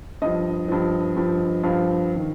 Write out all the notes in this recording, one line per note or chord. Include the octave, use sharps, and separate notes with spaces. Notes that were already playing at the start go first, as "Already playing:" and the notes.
G2 F3 D#5
G2 F3
G2 F3
G2 F3 F5
D#3